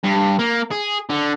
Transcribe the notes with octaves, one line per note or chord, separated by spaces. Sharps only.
G2
A#3
G#4
D3